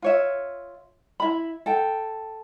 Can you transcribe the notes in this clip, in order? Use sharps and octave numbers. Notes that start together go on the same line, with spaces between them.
F4 C#5 E5
E4 B5
A4 G5